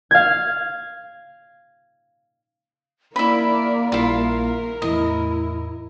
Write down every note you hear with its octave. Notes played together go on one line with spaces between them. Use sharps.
F5 G#6
A#3 E4 A#4 D5 B5
A#1 G3 E4 F4 A#4 C7
E2 A2 E4 D#5